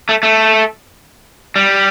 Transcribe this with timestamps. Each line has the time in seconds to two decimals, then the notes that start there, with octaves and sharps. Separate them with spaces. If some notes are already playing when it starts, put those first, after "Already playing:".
0.09 A3
0.23 A3
1.56 G3